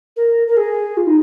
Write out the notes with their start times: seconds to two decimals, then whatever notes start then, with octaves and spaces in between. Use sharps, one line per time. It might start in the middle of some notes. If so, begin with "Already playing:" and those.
0.17 A#4
0.48 A#4
0.57 G#4
0.97 F4
1.07 D#4